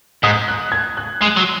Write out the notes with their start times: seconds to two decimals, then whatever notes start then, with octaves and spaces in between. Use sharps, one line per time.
0.23 G#2 D#6
0.48 F#6
0.72 G#6
0.97 F#6
1.21 G#3 C7
1.37 F#3